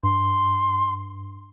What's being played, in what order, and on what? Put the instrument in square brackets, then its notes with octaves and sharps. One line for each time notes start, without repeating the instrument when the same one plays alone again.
[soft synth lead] G2 [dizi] C6